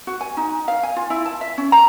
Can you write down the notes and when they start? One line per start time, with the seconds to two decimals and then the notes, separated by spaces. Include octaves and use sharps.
0.07 F#4
0.21 G#5
0.37 D#4
0.68 F5
0.83 G#5
0.96 F4
1.10 E4
1.26 A5
1.41 E5
1.58 C#4
1.72 A#5